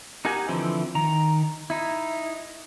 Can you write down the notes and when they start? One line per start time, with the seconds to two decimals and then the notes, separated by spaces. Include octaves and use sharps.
0.25 D#4 G4 A#4 F#5 G#5
0.48 D3 E3 F3 C4 E4
0.95 D#3 A#5
1.70 D#4 E4